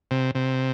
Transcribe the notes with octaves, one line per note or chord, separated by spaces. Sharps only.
C3
C3